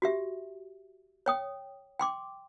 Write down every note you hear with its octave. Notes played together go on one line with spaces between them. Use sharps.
F#4 G4 E5
C#5 G5 D#6
G5 C6 D6